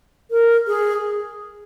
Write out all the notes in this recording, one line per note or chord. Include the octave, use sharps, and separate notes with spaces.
A#4
G#4